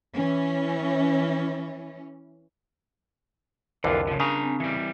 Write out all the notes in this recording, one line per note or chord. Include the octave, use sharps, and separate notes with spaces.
E3 C#4
C2 F2 D3 E3 F4 A#4
C#3 F3
C#3 D4 G#5 A#5 D#6
C4
E3 G3